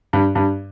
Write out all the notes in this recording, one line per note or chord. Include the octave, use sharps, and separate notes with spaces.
G2
G2